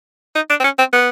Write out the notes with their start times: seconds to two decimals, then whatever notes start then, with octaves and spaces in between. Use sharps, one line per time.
0.36 D#4
0.50 D4
0.60 C4
0.64 C#4
0.79 C4
0.93 B3